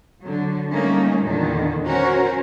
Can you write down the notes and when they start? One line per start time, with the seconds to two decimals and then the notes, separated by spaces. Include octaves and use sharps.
0.22 D3 F#3
0.73 G3 A3 A#3 C#4 D#4
1.22 E2 A#2 D3 D#3
1.85 C#4 F#4 A#4 C5